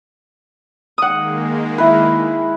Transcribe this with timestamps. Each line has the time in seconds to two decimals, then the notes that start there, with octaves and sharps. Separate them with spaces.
0.98 D#3 G#3 A#3 F#5 D#6
1.78 E4 B4